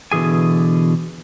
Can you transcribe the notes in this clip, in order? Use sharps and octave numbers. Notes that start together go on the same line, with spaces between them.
B2 D3 E3 G#4 G#5